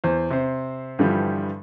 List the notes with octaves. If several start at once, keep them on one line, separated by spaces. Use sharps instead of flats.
E2 C5
C3 C5
G2 D3 E3 F3 G3